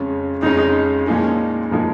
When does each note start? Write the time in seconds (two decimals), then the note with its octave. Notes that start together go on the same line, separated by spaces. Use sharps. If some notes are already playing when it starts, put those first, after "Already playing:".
Already playing: F2 C#3 G#3 C#4
0.42 F2 C#3 G#3 C#4 D#4
1.07 A#2 F3 G#3 C#4 D#4 G#4
1.71 A#2 F3 G#3 D#4 G#4